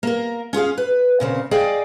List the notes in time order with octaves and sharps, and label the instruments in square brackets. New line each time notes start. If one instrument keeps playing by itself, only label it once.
[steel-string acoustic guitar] A#3 A#4
C#4 F4 G#4 F5
B4
A#2 C#3 C4
G#4 D5 D#5 F5 G5